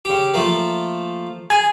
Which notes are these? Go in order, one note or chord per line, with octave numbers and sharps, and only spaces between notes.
C#3 G4
F3 A3 A#3
G#4 G#5